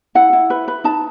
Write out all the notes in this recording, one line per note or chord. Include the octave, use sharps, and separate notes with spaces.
E4 F#5
E4
B4
B4
D#4 A5